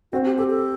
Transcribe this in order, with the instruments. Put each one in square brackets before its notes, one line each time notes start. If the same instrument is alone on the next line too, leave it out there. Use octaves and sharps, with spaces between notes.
[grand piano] C4 [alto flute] F#4
[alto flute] G4
[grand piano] G4 [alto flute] A4
[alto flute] A4